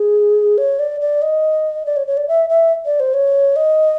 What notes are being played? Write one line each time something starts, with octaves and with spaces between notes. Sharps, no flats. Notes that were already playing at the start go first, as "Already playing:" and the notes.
Already playing: G#4
C#5
D5
D5
D#5
D5
C#5
C#5
D5
E5
E5
D5
C5
C#5
D#5